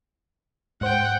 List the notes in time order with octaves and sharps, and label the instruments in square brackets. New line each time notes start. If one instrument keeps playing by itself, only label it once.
[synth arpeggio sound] G#2 C5 [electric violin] F#5 G5